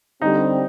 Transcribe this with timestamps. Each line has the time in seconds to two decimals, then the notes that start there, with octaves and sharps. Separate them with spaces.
0.21 D3 G3 C4 D#4